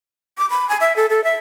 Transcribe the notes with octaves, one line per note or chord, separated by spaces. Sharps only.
D6
B5
G#5
E5
A4
A4
E5